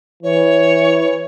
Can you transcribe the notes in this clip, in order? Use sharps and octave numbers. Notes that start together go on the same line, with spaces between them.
E3 C#5